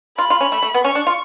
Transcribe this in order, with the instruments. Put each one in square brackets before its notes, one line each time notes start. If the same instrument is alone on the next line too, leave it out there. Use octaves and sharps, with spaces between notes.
[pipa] F4 [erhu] B5
[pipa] F4
C#4
A3
A3
B3
[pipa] C#4 [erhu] C#6
[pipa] D4
F4